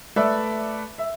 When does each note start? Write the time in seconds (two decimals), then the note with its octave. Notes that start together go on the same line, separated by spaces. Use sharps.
0.16 A3 A4 B4 D5 E5
0.98 E5